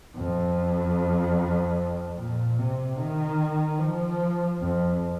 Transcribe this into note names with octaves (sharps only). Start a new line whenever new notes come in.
F2
A#2
C3
D#3
F3
F2